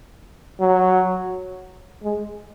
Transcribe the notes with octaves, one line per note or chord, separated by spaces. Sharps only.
F#3
G#3